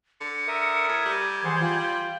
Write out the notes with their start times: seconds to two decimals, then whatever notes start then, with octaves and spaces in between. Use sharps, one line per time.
0.21 D3 C#7
0.48 A#4 E5 D#6
0.88 A2 G#6
1.05 G3
1.44 E3 G#4 C5 F#5
1.61 F4 G5